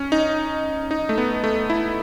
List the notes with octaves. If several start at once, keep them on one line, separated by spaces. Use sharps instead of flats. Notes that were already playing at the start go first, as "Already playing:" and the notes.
Already playing: C#4
D#4
D#4
A3
B3
A3
E4